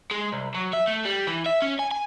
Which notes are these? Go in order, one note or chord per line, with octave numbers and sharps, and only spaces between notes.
G#3
C2
F#3
E5
A3
G3
E3
E5
C#4
G#5
G#5